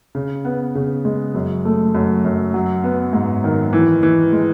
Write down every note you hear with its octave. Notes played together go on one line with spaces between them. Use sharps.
C#3
B3
C#3
G#3
F#2
A3
F#2
F#2
F#3
B3
G#2
D#3
E3
E3
G#3